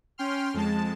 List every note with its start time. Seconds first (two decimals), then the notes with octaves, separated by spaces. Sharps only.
0.18 C#4 G5 C6 F6
0.54 F2 G#3 A5